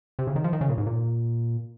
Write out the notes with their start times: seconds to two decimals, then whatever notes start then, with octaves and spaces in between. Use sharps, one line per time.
0.19 C3
0.27 C#3
0.36 D#3
0.44 F3
0.53 D#3
0.61 C#3
0.70 A#2
0.78 G#2
0.87 A#2